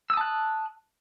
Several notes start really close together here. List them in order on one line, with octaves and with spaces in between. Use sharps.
E6 D#6 A5 F#6